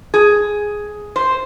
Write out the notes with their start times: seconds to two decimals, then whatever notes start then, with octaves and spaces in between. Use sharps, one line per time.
0.14 G#4
1.16 C5